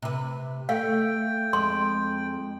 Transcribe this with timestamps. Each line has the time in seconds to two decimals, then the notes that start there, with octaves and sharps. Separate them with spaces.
0.02 C3 B4
0.69 A3 F5 G5
1.53 F2 G#3 C6